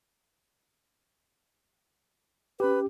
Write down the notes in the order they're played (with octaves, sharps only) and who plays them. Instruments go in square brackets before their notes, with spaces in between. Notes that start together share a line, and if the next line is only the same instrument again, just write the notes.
[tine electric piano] C#4 G4 [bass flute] B4